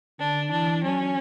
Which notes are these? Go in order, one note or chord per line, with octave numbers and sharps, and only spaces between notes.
D3 D4
E3 D4
F#3 C#4